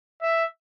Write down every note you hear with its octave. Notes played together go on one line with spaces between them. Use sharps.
E5